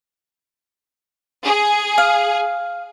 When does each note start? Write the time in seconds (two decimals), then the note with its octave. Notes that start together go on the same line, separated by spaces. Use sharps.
1.44 G#4
1.98 F5